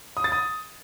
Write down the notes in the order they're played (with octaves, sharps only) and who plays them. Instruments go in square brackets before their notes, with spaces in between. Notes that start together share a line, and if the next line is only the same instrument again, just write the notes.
[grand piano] D#6
A6
D#6